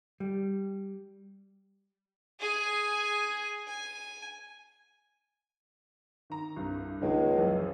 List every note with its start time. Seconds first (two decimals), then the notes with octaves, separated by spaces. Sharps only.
0.20 G3
2.40 G#4 G#5
3.68 G#5
6.30 D#3 A#5
6.56 C2 G2
7.02 C#2 D#3 G#3 A#3
7.36 F#2 E3 F3